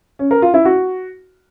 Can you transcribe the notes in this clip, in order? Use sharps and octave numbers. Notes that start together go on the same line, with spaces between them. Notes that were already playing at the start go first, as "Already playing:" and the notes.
C#4
A#4
F4
E4
F#4